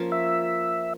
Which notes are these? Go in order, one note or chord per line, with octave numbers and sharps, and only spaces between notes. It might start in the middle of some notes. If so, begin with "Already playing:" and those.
Already playing: F3 A#3 C#4
E5